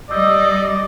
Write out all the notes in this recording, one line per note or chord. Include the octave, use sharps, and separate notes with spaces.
G3 D5 D#5 D6 E6 G6